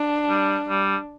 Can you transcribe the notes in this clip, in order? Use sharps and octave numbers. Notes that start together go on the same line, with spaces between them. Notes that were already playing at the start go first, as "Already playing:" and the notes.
Already playing: D4
G3
G3